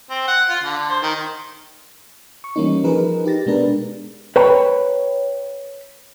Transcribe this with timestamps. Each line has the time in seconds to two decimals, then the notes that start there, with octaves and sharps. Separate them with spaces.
0.10 C4
0.28 F#5
0.49 F4
0.63 D3
0.89 C5
1.03 D#3
2.44 C#6
2.56 E3 G3 A#3 C#4 D#4
2.84 F3 D#4 G#4 A#4 B4
3.25 D#4 G4 A6 A#6
3.46 B2 G#3 B3 D4 A#4 B4
4.36 B4 C#5 G5 A#5 B5